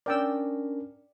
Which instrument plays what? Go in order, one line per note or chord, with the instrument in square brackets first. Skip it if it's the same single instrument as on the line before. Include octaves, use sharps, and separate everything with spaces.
[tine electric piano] C#4 D4 A#4 [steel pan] D5 G5 E6